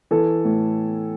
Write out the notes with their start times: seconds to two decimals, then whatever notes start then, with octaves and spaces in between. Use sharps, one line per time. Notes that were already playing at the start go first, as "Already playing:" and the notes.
0.11 E3 A4
0.45 A2